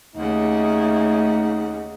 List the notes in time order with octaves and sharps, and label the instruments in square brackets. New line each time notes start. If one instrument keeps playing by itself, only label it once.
[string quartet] D#2 C#3 F#5 [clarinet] A3 [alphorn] D#4